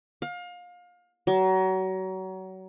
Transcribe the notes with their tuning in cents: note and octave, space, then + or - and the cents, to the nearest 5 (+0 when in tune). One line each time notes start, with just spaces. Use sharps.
F5 +30
F#3 +30